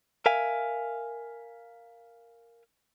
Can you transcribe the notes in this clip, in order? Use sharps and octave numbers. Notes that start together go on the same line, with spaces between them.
A#4 E5 F5 G#5